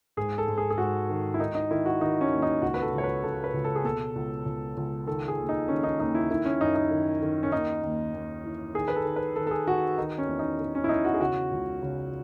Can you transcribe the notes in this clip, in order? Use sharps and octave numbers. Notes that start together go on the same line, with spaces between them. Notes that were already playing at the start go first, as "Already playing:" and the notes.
G#2 G#4
A4
G#2
G#4
G#4
G#2 F#4
D#3
E4
D#3 D#4
D#4
D#3 E4
F#4
D#3 D#4
C#4
D#2
D#4
C#2 F#4
B4
A4
C#2
C#5
B4
C#3 A4
B4
C#2
A4
G#4
B2 A4
C#2
C#2
C#2
D#3 A4
G#4
D#2
D#4
D#3 C#4
D#4
D#2 D#4
E4
D#3 E4
C#4
F#2 D#4
D#4
D#3
D#3
C#4
D#2 D#4
D#2
D#2
E3
D#3 G#4
B4
A4
D#3
B4
D#3 A4
A4
G#4
D#3 F#4
D#3 D#4
C#4
E2
D#4
D#3
C#4
E4
E2 D#4
F#4
G#4
C#3 F#4
C#2
C#3